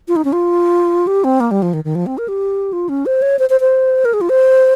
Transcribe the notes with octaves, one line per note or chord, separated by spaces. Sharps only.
F4
D#4
C#4
F4
G4
C4
A#3
G3
F3
D#3
D#3
F3
C4
A#4
G4
F4
C#4
C5
C#5
C5
C5
C5
A#4
G#4
F4
C5